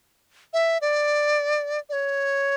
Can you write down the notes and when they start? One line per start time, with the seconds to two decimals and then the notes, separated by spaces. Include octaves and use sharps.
0.53 E5
0.81 D5
1.89 D5
1.93 C#5